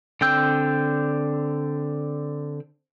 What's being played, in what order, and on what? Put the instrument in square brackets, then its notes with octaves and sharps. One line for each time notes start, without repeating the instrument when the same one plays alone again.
[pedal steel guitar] D3 C4 G5 E6